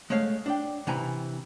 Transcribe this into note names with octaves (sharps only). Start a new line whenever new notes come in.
G#3 A3 C#5 F5
D4 G5
C3 E3 G#5 A#5